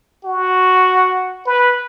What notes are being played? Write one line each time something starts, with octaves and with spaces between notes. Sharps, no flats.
F#4
B4